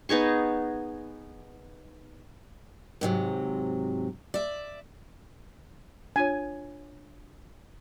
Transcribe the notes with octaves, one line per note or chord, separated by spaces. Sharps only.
B3 D#4 G#4 C#6
G#2 C3 F#3
D5 E5
D4 F4 C#5 G#5